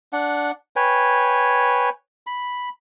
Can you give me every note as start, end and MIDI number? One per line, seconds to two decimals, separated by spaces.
0.13 0.51 62
0.13 0.51 78
0.76 1.89 71
0.76 1.89 73
0.76 1.89 79
0.76 1.89 80
2.27 2.69 83